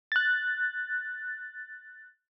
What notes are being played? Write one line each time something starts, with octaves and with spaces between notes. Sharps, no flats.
F#6 A6